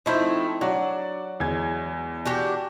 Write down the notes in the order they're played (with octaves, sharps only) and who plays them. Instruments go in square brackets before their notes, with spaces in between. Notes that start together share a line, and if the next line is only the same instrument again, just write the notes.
[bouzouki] F3 A3 C4 [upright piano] D#4 E4
[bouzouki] F#3 [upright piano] D4 F#4 D5
[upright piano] E2 G#3 G#6
[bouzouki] D4 F#4 G4